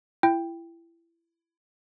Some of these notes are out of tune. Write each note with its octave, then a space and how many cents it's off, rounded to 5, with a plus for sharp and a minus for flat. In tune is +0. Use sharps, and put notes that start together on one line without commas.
E4 +25 G5 +5